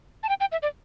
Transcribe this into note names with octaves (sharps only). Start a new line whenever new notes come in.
A5
G5
G5
E5
D5